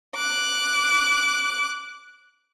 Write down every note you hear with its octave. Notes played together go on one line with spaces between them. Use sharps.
D6 F#6